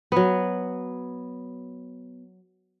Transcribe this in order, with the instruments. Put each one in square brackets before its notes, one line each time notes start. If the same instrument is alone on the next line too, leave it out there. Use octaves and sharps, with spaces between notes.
[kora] F#3 B3